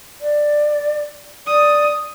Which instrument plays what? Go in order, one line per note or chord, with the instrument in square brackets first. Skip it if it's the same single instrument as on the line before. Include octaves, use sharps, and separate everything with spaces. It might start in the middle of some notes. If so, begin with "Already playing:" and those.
[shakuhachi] D5
[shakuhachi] D5 [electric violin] D#6